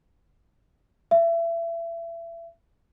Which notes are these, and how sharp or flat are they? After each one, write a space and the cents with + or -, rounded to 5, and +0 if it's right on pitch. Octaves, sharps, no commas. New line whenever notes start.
E5 +30